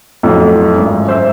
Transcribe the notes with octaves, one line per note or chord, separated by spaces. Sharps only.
F2 A2 F#3
G#1 F#2
C5 E5